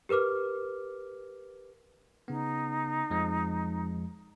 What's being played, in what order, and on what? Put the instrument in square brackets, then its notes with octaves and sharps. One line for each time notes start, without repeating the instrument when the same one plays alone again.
[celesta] G4 A#4 B4 D6 F6
[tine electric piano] C#3 B3 [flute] D#4
[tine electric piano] F2 F3 G#3